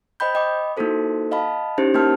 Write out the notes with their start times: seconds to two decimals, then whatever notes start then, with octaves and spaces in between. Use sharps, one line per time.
0.20 C5 D#5 G5 B5 G6
0.35 D#5 G5 B5 D6
0.77 A#3 D#4 E4 F#4 A4 C5
1.31 D#5 F5 A5 B5
1.78 C#4 D#4 E4 G4 C5
1.94 A#3 D#4 A#4 G5 A5 F6